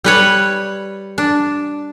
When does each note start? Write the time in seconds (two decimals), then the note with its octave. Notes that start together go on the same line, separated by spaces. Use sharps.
0.04 G3 B4 C#5
1.18 D4